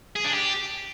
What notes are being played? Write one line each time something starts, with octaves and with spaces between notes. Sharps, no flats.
G#4
D4
G4